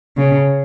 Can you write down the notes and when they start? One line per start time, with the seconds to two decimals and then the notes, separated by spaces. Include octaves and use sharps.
0.17 C#3